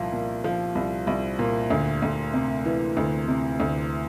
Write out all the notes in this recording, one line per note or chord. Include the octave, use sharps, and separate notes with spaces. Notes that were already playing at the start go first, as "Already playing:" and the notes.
Already playing: C2 A#2 F3
A#2
F3
C2
C2
A#2
D2
D2
C3
E3
D2
C3
D2